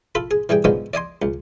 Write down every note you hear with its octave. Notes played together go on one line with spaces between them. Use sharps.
F4 A4 B5
G#4
E3 G3 G#4 G5
D3 D#3 F3 G#3 B3
D5 D#5 G#5 C6
C#2